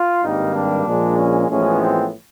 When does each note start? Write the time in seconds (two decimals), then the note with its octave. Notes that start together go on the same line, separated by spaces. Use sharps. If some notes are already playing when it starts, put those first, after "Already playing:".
Already playing: F4
0.23 G#1 G2 D#3 G3 A#3 D#4
0.55 D4
0.85 A#1 A#2 F3 G#3
1.17 C#4
1.48 A1 A2 F3 G#3 B3 C#4
1.79 C4